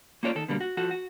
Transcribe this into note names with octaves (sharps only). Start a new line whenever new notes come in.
A#3 C#4 F4 A4 C#5 D5
D#3 A4
B2 D3 G3 A#3
F#4
F3 F#4 A4
F#4